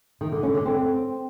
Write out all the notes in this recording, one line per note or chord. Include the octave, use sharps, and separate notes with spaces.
D#3
D3
C#4
D3
C4